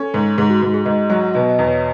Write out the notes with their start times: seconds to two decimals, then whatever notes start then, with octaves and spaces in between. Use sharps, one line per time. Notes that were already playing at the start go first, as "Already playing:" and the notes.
Already playing: C#4 A4
0.14 G#2
0.38 G#2 G#4
0.50 F#4
0.61 G#2 F#4
0.74 G#4
0.85 G#2 D#5
1.10 F#3 D#5
1.34 B2 D#5
1.50 D#5
1.59 E2
1.67 C#5